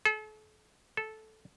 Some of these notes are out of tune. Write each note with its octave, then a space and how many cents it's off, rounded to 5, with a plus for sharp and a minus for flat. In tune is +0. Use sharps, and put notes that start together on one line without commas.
A4 -40
A4 -10